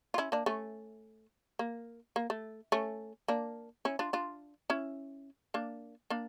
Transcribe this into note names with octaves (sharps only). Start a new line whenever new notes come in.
F4
C#4 E4
A#3 D4
A3 C#4
A#3
A#3
A3
A3 C#4
A#3 D4
C#4 E4
D4 F4
D4 F4
C#4 E4
A#3 D4
A#3 D4